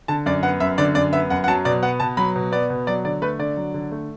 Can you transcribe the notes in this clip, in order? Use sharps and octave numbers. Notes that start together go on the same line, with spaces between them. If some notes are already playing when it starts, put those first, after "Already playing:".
D3 A5
F#2 D5
B3 F#5
F#2 E5
D3 D5
F#2 D5
B3 E5
F#2 F#5
F#5
F#3 A5
B2 D5
B3 F#5
B2 A5
F#3 B5
B2
B3 D5
B2
F#3 D5
D3 D5
A3 B4
D3 D5
F#3
D3
A3